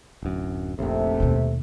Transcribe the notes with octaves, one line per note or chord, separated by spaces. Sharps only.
D1 F#2
F1 A#1 C3 A3
D#2 B2